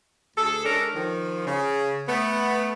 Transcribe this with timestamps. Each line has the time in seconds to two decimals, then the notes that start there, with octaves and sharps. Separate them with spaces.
0.37 D2 G#4 A4
0.65 G#3 C#4 D4 A4 A#4
0.95 D#3 F3
1.46 C#3
2.07 A3 B3